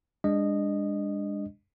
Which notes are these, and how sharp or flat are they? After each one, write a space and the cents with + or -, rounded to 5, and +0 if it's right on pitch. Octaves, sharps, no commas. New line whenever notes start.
G#3 -40 D4 +0 D#5 -15